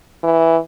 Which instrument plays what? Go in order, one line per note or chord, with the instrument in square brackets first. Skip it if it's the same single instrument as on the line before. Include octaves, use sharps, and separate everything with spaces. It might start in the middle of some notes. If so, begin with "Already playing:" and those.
[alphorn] E3